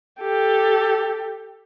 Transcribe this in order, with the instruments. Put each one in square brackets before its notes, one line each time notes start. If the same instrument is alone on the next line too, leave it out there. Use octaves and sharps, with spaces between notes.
[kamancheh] G4 A4